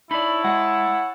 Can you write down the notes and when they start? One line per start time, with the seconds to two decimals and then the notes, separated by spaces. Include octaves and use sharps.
0.11 D#4 E4 C#5 D5 A5 B5
0.44 G#3 F#5